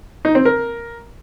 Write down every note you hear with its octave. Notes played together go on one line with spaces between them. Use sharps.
D#4
C4
A#4